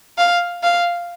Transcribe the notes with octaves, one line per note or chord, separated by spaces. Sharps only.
F5
F5